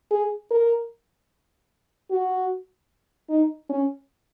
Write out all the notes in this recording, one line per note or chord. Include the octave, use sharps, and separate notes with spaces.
G#4
A#4
F#4
D#4
C#4